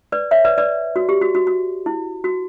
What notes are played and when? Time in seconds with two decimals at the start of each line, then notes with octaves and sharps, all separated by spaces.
0.12 B4 D5
0.31 C#5 E5
0.45 B4 D5
0.58 B4 D5
0.96 F#4
1.09 G4
1.21 F#4
1.35 F#4
1.47 F#4
1.86 E4
2.24 F#4